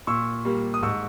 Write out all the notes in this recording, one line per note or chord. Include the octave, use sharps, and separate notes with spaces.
A#2 C#6 E6
G3 A#3
D#6
G#2 C#6 E6